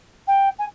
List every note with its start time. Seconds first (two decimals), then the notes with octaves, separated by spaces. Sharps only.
0.27 G5
0.58 G#5